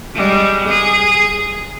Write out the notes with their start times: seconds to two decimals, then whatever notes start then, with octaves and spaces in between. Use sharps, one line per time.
0.15 G3 G#3
0.68 G#4